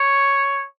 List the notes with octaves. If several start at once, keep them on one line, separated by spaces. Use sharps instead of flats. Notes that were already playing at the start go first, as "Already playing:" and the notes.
Already playing: C#5